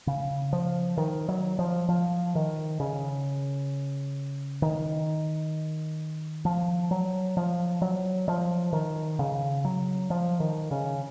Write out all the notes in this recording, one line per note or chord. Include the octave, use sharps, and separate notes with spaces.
C#3
F3
D#3
F#3
F3
F3
D#3
C#3
D#3
F3
F#3
F3
F#3
F3
D#3
C#3
F#3
F3
D#3
C#3